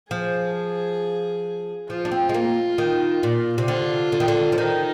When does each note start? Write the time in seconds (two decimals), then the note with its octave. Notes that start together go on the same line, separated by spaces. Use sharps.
0.11 F3 G#4
1.89 F3 F4
2.05 D4
2.12 C4
2.29 G#3
2.34 A#3
2.78 D#3
3.23 A#2
3.58 C3
3.68 D3 F4
4.12 D3
4.20 D#3
4.28 D3
4.52 F3
4.58 D#3 D#4